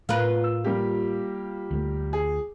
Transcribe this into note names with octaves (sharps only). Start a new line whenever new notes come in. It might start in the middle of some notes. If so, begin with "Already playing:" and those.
A2 A3 D4 F4 A#4 B4
E6
G3 A#3 G4
D2 G#3 A3
G#4